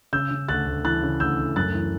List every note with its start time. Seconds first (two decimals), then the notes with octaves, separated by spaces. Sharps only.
0.13 C#3 E6 G6
0.31 C#3
0.49 D2 F#6 A6
0.67 D2
0.84 E3 F#6 A6
1.03 C#3
1.20 D2 E6 G6
1.38 D2
1.56 F#2 F#6 A6
1.74 E3